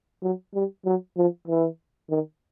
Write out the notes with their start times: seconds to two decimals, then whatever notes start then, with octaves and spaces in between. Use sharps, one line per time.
0.23 F#3
0.54 G3
0.85 F#3
1.17 F3
1.48 E3
2.10 D#3